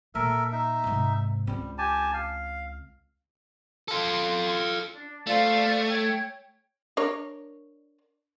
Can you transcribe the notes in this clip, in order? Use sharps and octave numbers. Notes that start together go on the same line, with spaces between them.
A#2 A#3 A4 A#4 E5
D#4 E5
G#2 C3
C#2 G3 C4
G4 G#5 A5
F5
F4 A4 C6
D4
A3 F4 C5 D5
C#5 G5
D4 A#4 C#5